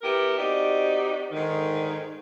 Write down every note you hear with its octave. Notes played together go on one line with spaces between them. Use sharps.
B3 E4 G4 A#4
C4 D#4 F#4 G4 D5
G#2 D3 D#3